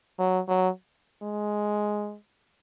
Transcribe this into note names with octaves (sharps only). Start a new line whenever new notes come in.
F#3
F#3
G#3